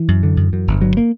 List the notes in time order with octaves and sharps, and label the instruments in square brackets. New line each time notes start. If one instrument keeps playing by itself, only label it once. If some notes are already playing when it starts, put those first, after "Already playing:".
Already playing: [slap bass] E3
F#2
D3
F#2
F#2
G1
G2 F#3
A#3